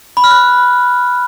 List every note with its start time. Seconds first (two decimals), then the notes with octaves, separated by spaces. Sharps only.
0.17 B5
0.24 F6
0.31 F#6